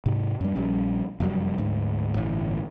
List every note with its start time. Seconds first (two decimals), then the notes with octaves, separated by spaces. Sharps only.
0.06 G#2 C3
0.41 F#2 G3
0.55 A#1 G3 C#4
1.20 F1 F#2 F#3 G3
1.58 D2 G#2
2.15 G1 A2 E3